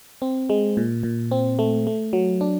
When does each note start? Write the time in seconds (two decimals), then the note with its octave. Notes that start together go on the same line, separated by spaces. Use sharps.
0.22 C4
0.50 G#3
0.77 A#2
1.03 A#2
1.31 C4
1.59 A3
1.87 A3
2.13 F#3
2.41 D4